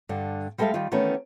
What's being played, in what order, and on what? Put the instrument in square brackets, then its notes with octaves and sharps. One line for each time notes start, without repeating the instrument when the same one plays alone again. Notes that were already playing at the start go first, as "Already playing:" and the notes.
[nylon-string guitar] G2 D3
G3 G#3 A4 D5 E5 F5
D#3 G3 F4
D#3 E3 A3 B3 C#4